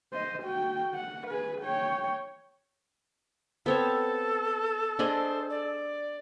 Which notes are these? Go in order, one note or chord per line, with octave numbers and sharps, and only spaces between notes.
C5 D#5
F#4 G5
F#5
G#4 B4
C#5 G5
B3 C4 A4 C#5
D4 G#4 C5 D#5
D5